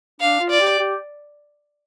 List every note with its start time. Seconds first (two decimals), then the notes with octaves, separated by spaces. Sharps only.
0.21 D4 F5
0.40 F4
0.50 D5
0.60 G4
0.79 G4